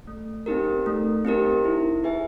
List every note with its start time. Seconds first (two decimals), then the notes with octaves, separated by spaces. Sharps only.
0.07 A3
0.46 C4 D#4 G4 A#4
0.86 A3
1.25 C4 D#4 G4 A#4
1.65 E4
2.03 G#4 B4 E5 G#5